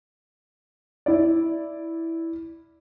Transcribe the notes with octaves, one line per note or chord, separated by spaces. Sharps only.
E4 D5